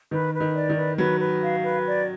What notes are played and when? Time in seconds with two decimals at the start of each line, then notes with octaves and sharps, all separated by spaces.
0.11 D#3 B4
0.34 B4
0.40 D#3
0.55 D5
0.69 D#3
0.77 B4
0.98 F#3 B4
1.20 B4
1.43 F5
1.64 B4
1.86 D5